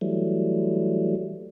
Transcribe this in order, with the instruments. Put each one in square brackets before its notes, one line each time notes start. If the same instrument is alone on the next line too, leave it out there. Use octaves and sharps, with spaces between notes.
[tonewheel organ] E3 F#3 G3 A3